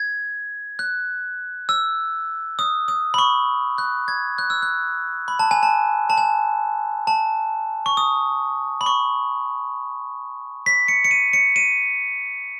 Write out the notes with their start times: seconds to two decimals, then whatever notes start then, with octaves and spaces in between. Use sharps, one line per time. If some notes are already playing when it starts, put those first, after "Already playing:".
Already playing: G#6
0.79 F#6
1.69 E6
2.59 D#6
2.88 D#6
3.14 B5
3.18 C#6
3.78 F#6
4.08 G#6
4.38 F#6
4.50 E6
4.62 F#6
5.28 B5
5.39 A5
5.51 G#5
5.63 A5
6.10 A5
6.18 G#5
7.07 A5
7.86 C#6
7.97 D#6
8.81 B5
8.86 C#6
10.66 B6
10.88 C#7
11.04 C#7
11.11 D#7
11.33 C#7
11.56 D#7